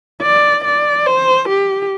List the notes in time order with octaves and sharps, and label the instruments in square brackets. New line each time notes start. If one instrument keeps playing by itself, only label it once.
[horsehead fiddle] D5
D5
C5
G4